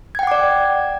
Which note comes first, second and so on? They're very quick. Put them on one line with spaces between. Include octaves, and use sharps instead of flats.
G#6 G5 F#5 D6 D5